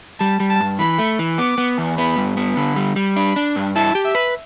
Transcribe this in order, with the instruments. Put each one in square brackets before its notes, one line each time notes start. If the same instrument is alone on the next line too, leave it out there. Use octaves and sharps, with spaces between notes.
[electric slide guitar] G3 [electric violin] A5
[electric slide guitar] G3
[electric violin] A5
[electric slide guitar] G2
[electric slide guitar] E3 [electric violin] B5
[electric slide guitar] A3
E3
[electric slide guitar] B3 [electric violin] D6
[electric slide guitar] B3
E2
[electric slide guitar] B3 [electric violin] B5
[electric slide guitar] G2
B3
[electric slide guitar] D3 [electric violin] B5
[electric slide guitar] G3
G3
[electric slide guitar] D4 [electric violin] B5
[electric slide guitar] D4
G2
[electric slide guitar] E4 [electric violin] A5
[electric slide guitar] G4
[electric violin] E5
[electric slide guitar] B4